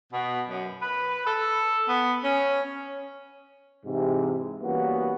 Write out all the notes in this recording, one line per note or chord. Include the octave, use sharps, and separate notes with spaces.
B2
F#2
B4
A4
B3
C#4
G#2 C3 E3
E3 G3 A#3 B3 C#4 F#4